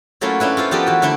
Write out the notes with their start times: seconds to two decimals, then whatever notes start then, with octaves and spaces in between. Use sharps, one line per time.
0.21 F#3 A3 A#3 C#4 E4 F4
0.40 C#4 D4 E4 B4
0.57 F4 A4 C5
0.71 F3 B3 G4 A4 A#4 D5
0.87 E3 F#4
1.02 D3 A3 D4 E4 F#4